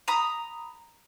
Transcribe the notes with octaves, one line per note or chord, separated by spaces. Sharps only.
A#5 B5 D#6